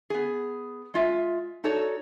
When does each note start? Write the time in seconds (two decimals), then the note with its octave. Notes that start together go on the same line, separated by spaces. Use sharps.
0.10 B3 G#4
0.94 G#3 F4 E5
1.64 D#4 F#4 A4 C#5 D5